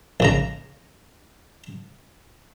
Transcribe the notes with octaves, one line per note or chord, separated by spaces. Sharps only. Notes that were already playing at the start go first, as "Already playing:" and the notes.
A#1 C#3 A#5